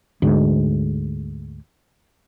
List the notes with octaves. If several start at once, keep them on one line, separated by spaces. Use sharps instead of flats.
D2 G#2